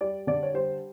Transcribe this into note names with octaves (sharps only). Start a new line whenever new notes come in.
G3 D5
D3 D5
C#5
G3 C5